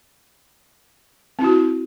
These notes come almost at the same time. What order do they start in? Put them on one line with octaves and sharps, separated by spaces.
C4 E4 F#4